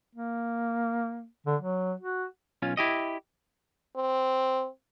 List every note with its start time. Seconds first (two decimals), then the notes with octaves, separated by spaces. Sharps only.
0.15 A#3
1.46 D3
1.62 F#3
2.00 F#4
2.62 B1 C#4 F4
2.77 E4 G4 D#5
3.96 C4